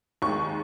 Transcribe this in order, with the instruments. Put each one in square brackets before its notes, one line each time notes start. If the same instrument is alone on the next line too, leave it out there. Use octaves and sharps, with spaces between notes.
[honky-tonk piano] D#2 D#3 G#3 C#6